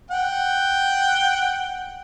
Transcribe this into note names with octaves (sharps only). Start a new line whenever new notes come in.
F#5 G5